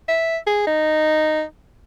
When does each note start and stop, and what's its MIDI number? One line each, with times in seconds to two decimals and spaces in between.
0.08 0.37 76
0.47 0.63 68
0.67 1.42 63